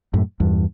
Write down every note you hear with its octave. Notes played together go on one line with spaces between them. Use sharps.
F#2 A2
E2 G2